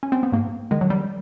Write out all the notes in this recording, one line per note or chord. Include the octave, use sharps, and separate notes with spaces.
C#4
C4
B3
G#2 A#3
D#3 G#3
F#3
G3